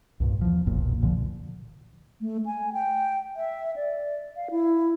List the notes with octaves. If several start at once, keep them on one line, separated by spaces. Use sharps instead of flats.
C2 G2 A#2
E2 F3
F1 B1 F2 A#2
C2 A#2 D3 F3
A3
G#5
G5
E5
D5
F5
E4